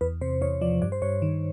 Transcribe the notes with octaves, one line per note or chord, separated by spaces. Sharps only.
E2 B4
C3 C5
E2 C#5
F3 D5
G2 D5
C5
G2 C#5
D#3